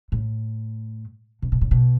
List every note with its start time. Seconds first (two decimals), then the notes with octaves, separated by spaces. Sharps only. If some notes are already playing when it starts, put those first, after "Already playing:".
0.12 A2
1.42 C3
1.52 B2
1.61 A2
1.71 B2